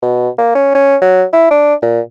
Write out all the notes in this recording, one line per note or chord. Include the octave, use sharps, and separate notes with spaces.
B2
A#3
C#4
C#4
F#3
E4
D4
A#2